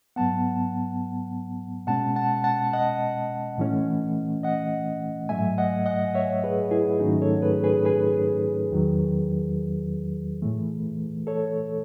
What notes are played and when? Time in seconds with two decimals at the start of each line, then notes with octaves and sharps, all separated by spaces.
0.16 G#2 F#3 B3 F#5 A5
1.87 B2 G#3 C#4 F#5 A5
2.16 F#5 A5
2.44 F#5 A5
2.73 D#5 F#5
3.58 A2 E3 A3 C#4
4.43 D#5 F#5
5.29 G#2 F#3 A3 E5 G#5
5.58 D#5 F#5
5.86 D#5 F#5
6.14 C#5 E5
6.44 G#4 B4
6.71 E4 G#4
7.00 G#2 D#3 F#3 A3 C#4 D#4 F#4
7.22 A4 C#5
7.42 G#4 B4
7.64 G#4 B4
7.85 G#4 B4
8.71 E2 D#3 F#3
10.42 A2 E3 A3
11.27 A4 C#5